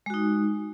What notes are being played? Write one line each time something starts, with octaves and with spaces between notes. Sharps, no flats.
G#3 D#4 F#4